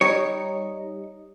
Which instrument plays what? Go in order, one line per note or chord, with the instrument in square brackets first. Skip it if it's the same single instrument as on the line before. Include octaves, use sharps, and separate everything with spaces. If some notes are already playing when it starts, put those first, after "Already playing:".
[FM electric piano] G3 D#4 D#5 [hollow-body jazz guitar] C#5